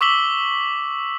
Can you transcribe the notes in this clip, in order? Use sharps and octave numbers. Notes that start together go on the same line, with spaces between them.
C#6 D6 E6 B6 F#7 G7